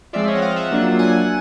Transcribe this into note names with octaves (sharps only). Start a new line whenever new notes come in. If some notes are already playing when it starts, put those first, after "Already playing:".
F3 G#3 C4 F4 D5 E5
C#5 D#5
F#5
D#5 F5
E5 F#5
F#3 A#3 D4 F4
F#5 G#5